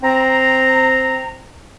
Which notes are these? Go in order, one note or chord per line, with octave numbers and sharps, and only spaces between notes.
C4 A#5